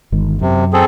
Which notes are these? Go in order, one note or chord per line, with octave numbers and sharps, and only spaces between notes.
G1 D#3 G#3
F#2 C3
C4 G#4 A4